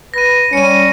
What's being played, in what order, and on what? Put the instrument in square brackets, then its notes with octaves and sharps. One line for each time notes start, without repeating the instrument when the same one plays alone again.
[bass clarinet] B4 [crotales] A#6 D#7
[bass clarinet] G3 [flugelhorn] C#4 [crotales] C#7 D#7